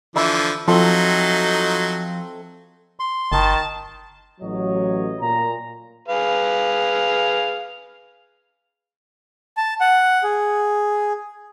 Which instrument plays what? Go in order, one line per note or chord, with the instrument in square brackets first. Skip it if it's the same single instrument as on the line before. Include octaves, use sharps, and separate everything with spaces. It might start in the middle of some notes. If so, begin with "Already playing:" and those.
[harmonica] D3 E3 F3 [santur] E5 B5
[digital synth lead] F3 [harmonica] F#3 D#4 [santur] C4 A4
[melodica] C6
[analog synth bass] G1 [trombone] D#3 [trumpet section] A5
[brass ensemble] A1 F#3 C#5 D#5
A#2 A#5
[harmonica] G#4 B4 F5
[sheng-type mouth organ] A5
F#5
G#4